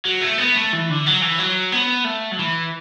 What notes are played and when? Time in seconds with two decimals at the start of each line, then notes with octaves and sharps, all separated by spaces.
0.06 F#3
0.21 A3
0.38 B3
0.55 A3
0.73 E3
0.89 D3
1.06 F#3
1.22 E3
1.38 F#3
1.72 B3
2.05 A3
2.32 F#3
2.39 E3